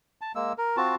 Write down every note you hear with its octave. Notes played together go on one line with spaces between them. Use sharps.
A5
G#3 A#3 E6
A#4
C4 F4 F#4 A5